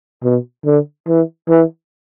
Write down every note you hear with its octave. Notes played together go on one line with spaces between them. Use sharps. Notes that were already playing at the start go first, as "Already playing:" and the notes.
B2
D3
E3
E3